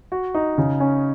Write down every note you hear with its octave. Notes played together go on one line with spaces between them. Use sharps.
F#4
D#4
C#3
C#4